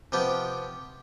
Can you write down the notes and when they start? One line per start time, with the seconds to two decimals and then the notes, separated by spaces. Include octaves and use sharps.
0.12 C3 F3 B3 G4